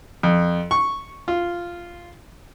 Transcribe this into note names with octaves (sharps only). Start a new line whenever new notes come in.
F2
C#6
F4